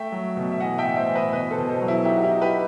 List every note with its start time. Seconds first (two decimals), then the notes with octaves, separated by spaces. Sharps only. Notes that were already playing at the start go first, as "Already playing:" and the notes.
Already playing: A3 E5 G5
0.12 F#3
0.37 B2
0.52 E5
0.60 E3 D#5 F#5
0.78 E5 G5
0.85 A2
0.96 C5 E5
1.09 E3
1.15 B4 D#5
1.33 B2 B4 D#5
1.51 A4 C5
1.58 B2
1.70 A4 C5
1.81 F#3
1.88 E4
2.05 D#4 E4 G4
2.17 F#4
2.23 E4 G4
2.30 D#4
2.42 G4 B4